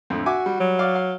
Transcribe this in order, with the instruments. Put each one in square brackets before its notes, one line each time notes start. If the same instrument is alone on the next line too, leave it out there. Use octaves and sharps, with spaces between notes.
[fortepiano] F2 A2 D3
[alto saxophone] F#4 [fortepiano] E5 G#5 D6
[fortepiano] G3
[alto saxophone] F#3
[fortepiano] D5 F5
F5